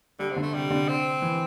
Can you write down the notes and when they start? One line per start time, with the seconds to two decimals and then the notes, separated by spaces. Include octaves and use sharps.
0.19 D3 G3
0.31 C3
0.36 D3
0.42 A3
0.54 C3 G3
0.70 D3
0.88 C4
1.22 E3